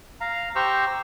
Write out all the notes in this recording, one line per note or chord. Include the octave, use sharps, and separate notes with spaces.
F5 A#5
G4 C5 A#5 C#6 E6